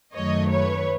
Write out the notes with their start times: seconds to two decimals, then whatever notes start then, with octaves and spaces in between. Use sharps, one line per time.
0.14 F#2 D#3 F#3 A3 C#5 D#5
0.50 B4 C#5